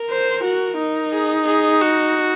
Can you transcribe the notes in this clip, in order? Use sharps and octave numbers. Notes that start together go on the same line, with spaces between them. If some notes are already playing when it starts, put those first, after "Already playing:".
Already playing: A#4
C5
F#4
D#4
G#4
G#4
F#4